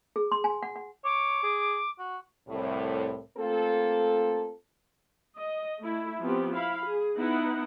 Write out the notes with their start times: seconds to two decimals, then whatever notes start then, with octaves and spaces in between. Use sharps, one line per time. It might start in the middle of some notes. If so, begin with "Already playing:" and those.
0.16 G#4
0.32 C6
0.44 G#5
0.63 F#5
0.76 F#5
1.04 C#5 D6
1.43 G#4
1.99 F#4
2.48 C2 A2
3.38 A3 A#3 C4 F4 A4
5.36 D#5
5.80 A3 E4
6.21 F3 B3 C4 G4
6.54 E4 F5 B5
6.85 G#4
7.17 B3 D#4 E4 F#5